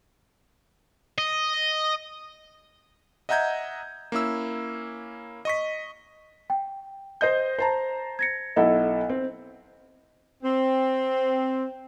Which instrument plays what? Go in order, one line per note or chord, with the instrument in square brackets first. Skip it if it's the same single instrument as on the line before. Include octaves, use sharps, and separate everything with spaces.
[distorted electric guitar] D#5
[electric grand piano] D#5 E5 F#5 A#5 G6 G#6
A#3 C#4 E4 E6
D#5 C#6 B6
[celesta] G5
[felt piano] C5 D#5 G6
C5 A5 A#5
[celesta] G#6 A#6 C#7
[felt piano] B1 E4 A4 [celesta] D#5 F#5
[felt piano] C4
[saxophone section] C4